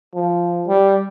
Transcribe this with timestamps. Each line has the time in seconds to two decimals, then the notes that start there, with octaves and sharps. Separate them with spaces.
0.14 F3
0.67 G3